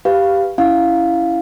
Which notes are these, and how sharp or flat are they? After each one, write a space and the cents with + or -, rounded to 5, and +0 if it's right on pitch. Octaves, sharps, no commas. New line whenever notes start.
G4 +0 B4 +0 F5 -5
C#4 +25 E4 +10 F5 +10